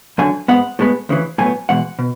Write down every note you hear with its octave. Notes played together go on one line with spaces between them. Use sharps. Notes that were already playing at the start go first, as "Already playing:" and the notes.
F#2 D3 F#3 G#5
G#2 G#3 B3 F#5
A2 G#3 B3
D2 C#3 E3
A2 F#3 B3 G#5
E2 B2 G#3 F#5
B2